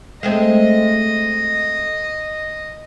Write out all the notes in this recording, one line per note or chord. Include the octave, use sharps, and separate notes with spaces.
G#3 A3 C4 D#5